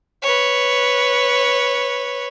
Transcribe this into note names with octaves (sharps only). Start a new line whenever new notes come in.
B4 C#5